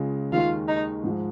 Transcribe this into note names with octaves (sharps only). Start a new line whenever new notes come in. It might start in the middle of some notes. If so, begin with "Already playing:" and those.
Already playing: C#2 C#3 G#3 F4
D#2 D#3 G#3 D#4 F4
D#4
G#2 F3 G#3